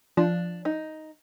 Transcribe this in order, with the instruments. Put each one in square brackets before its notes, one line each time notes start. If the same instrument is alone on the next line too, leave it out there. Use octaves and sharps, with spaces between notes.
[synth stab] F3 [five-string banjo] D4
[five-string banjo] D#4